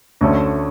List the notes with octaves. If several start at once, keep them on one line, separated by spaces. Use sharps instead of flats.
D2 D3 A3 C#4